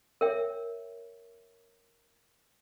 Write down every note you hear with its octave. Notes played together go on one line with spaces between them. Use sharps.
A#4 C#5 E5 G5